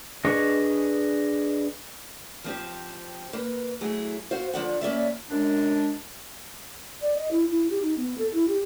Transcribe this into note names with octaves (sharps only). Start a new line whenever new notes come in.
D4 G#4 B4 D#5 C#6
F3 C4 G4
A#3 B4
F#3 A3 E4 G#4
F#4 C5 F5
D3 F3 D5 F#5
A#3 C#4 D5 E5
F#2 G#3 D4
D5
D#5
E4
E4
G4
D#4
B3
A4
E4
G4